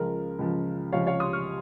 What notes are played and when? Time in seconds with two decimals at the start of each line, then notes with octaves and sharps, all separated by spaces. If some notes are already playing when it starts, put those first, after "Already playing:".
Already playing: C#2 C#3 F3 A#4
0.39 C#2 C#3 F3
0.92 C#2 C3 F3 C#5 F5
1.07 C#5 F5
1.20 C6 D#6
1.33 C#6 F6